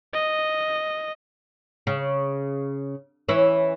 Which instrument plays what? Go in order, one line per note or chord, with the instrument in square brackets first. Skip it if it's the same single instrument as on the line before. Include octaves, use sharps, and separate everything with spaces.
[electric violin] D#5
[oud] C#3
E3 C#4 E4